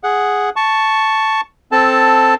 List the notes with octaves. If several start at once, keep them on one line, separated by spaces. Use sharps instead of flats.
G#4 F#5
A5 C#6
C4 A4 A5